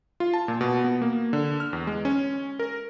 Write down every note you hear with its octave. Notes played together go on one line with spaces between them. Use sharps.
F4
A5
A#2
B2
B3
A#3
D3
F6
E2
G#3
C#4
A#4